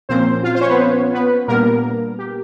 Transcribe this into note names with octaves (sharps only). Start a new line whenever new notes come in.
A#2 F3 A#3 C4 C#4 C5
F4 F5
C5
C#4 C#5
B3 B4
B3 B4
A#2 G3 A#3 B3 D4 A#4
G4